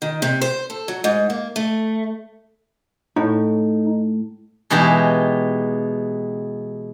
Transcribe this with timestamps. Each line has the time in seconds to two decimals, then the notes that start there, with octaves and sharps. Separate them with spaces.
0.02 D#3
0.22 C3
0.42 C5
0.70 A4
0.88 F#3
1.04 G#2
1.30 A#3
1.56 A3
3.16 A2 D#4
4.70 B2 E3 G#3 D#4 G4